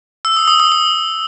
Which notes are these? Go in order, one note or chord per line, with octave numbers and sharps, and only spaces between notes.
E6
D#6
D#6
D#6
D#6